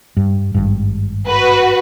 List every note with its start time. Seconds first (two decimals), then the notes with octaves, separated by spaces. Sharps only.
0.17 G2
0.54 G#1 G2
1.28 F#4 B4